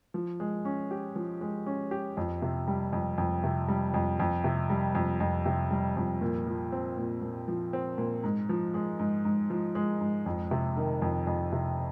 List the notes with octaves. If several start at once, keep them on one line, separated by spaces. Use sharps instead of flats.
F3
G#3
C#4
G4
F3
G#3
C#4
G4
F2
C3
G3
F2
F2
C3
G3
F2
F2
C3
G3
F2
F2
C3
G3
F2
A#2
F3
C4
A#2
A#2
F3
C4
A#2
G#2
F3
G#3
G#2
G#2
F3
G#3
G#2
F2
C3
D#3
F2
F2
C3